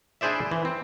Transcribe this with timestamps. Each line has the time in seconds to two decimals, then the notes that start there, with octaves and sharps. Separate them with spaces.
0.21 D4 E4 G#4 C5 D5 E5
0.51 E3
0.65 C4